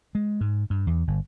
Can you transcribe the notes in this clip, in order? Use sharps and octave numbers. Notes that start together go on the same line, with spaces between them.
G#3
G#2
G2
E2
G1